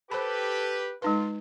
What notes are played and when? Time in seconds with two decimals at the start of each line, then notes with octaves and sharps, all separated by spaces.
0.11 G4 A4 B4 C5 B5
1.02 G#3 D#4 F4 B4